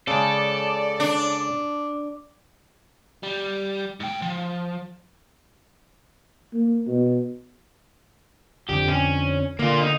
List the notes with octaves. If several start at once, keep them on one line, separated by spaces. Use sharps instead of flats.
C#3 G#3 A4 D5
D4
G3
G#2 G5
F3
A#3
B2
F2 D3 G4
C#4
D3 A#3 F4
D#4